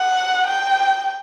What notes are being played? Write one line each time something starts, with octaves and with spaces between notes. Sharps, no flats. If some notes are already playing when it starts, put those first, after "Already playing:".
Already playing: F#5
G5